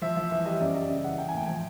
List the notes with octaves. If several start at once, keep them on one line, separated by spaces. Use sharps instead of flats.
F3 E5
F3 E5
E3 E5
G3 D#5
F#2 D5
G3 D#5
C#3 E5
E3 F#5
E3 G5
G#5
A2 G5
F3 G#5